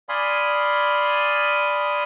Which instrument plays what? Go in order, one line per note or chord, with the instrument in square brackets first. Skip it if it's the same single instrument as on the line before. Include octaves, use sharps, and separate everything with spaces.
[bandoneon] D5 F5 G#5 B5 C6 D#6